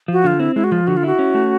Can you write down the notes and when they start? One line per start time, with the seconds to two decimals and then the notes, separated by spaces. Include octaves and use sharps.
0.08 F3 F#4
0.24 D3 F4
0.40 C4 E4
0.56 G#3 E4
0.64 F#4
0.72 F3 F4
0.87 D3 F#4
0.97 F4
1.03 E4 F#4
1.19 C#4
1.34 A3